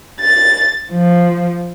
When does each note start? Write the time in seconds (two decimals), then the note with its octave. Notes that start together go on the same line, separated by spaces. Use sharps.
0.20 A6
0.91 F3